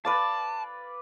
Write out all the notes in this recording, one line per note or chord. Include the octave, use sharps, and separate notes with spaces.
B4 D5 F5 A5